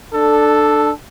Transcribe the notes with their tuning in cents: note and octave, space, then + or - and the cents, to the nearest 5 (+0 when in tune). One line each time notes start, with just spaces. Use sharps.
D4 +20 A4 +0